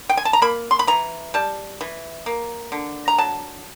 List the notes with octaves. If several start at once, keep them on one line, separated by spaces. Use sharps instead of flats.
G5
G#5
A5
A#5
A#3 B5
C6
B5
E3 A#5
G3 A5
E3
A#3
D3
A#5
F#3 A5